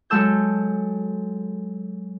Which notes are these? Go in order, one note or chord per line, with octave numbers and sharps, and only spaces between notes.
F#3 G#3 A4 E6 G6